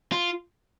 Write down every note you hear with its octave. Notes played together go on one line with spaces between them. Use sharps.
F4